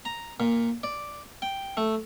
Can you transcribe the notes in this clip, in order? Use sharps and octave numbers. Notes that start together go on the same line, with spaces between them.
A#5
A#2
D5
G5
A3